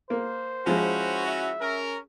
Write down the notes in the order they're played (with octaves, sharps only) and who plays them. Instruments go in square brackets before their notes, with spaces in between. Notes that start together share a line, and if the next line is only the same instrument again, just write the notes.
[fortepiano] A#3 [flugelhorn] C5
[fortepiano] F3 G#3 [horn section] C#4 E4 F#4
[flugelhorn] E5
[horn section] C#4 A#4